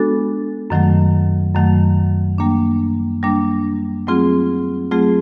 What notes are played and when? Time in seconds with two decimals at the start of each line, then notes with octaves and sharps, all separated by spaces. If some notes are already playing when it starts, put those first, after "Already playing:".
Already playing: G#3 B3 D4 F#4 A4
0.70 F#2 D#3 F#3 A3
1.54 F#2 D#3 F#3 A3
2.38 G3 A#3 D4
3.23 G3 A#3 D4
4.07 F#3 A3 C4 F4 G#4
4.91 F#3 A3 C4 F4 G#4